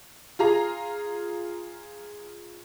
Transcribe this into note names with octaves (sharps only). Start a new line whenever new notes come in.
F4 G#4 A#5